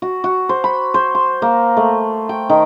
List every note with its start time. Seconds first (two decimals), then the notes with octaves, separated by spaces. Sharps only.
0.02 F#4
0.24 F#4
0.49 C5
0.64 B5
0.94 C5
1.15 C6
1.42 A#3
1.77 A3
2.29 G5
2.50 D#3